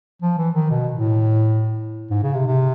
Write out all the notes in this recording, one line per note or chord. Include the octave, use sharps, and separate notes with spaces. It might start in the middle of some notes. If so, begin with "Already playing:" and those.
F3
E3
D#3
B2
A2
G#2
C#3
C3
C3